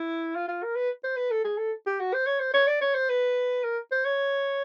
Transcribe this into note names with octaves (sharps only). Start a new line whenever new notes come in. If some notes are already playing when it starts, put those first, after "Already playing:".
Already playing: E4
F4
F4
A#4
B4
C5
B4
A4
G#4
A4
G4
F#4
C5
C#5
C5
C#5
D5
C#5
C5
B4
A#4
C5
C#5